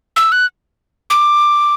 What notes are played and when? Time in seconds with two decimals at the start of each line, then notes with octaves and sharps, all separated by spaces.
0.16 E6
0.32 F#6
1.10 D6